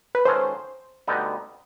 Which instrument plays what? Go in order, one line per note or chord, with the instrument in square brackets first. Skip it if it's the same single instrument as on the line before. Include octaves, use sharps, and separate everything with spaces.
[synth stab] B4
[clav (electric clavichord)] D#3 G#3 C#4 F#4 A4 [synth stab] C5
[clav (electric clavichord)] D2 D3 G3 B3 D#4